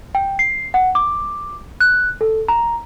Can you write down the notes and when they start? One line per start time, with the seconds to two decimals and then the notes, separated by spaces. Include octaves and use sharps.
0.15 G5
0.39 C7
0.74 F#5
0.95 D6
1.80 F#6
2.21 A4
2.48 A#5